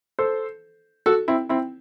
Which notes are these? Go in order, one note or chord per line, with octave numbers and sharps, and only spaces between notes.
A4 C5
F#4 A4
C4 E4
C4 E4